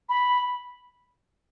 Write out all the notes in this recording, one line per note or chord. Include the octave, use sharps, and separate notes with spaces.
B5